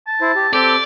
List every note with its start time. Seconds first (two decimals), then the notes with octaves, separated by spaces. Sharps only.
0.07 A5
0.21 E4 C5
0.35 G4
0.53 C4 G4 A4 D5